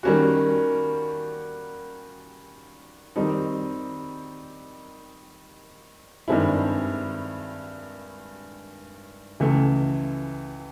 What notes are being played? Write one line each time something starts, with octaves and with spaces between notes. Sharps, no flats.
D#3 G3 A#3 C#4 F#4
D#3 G3 C4 D#4
G2 D#3 G#3 C4 E4
C#2 C#3 E3 A3